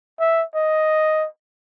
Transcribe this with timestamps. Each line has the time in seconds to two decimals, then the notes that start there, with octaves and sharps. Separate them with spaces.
0.20 E5
0.55 D#5